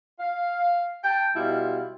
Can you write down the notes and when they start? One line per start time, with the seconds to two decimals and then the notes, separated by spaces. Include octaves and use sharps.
0.20 F5
1.03 G5 A5
1.35 B2 G3 E4 F4